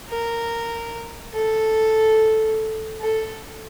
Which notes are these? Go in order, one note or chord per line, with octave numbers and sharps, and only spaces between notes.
A#4
A4
A4